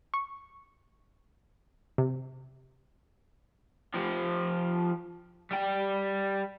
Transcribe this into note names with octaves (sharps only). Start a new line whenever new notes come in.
C#6
C3
F3 G4
G3 G5